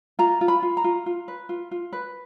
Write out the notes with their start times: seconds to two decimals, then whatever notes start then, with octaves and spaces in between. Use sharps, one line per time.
0.19 F4 A#5
0.41 F4
0.48 B5
0.62 F4
0.77 A#5
0.84 F4
1.06 F4
1.28 B4
1.49 F4
1.71 F4
1.93 B4